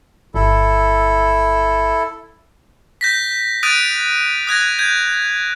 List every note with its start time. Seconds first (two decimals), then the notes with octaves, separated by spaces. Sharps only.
0.34 G1 E4 A4
3.01 G6 A#6 B6
3.63 D#6 F#6 A6 D7 D#7
4.47 D#6 F#6 G#6 A#6
4.79 G6 G#6